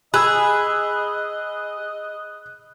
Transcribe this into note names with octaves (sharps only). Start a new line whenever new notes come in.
G#4 D#5 B5 E6 F#6